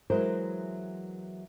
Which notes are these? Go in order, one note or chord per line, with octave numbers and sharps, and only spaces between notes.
E3 F#3 G#3 B3 A#4 C5